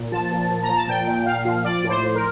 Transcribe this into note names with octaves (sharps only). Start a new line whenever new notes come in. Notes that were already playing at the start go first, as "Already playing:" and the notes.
Already playing: A#2
F3 A5
A#2
F3
A#5
F3
A5
A#2 G5
A#2
A#2 F5
F3
F3 D5
A2
C5
F3
A#4